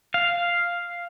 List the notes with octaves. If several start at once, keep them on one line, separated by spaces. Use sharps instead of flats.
F5